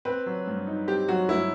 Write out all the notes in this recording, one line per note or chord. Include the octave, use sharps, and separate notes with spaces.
C4 B4
F#3
G2
D#4
C4 G4
F#3 F#4
G2 E4